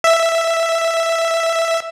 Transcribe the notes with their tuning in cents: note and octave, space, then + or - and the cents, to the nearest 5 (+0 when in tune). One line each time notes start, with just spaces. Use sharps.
E5 +5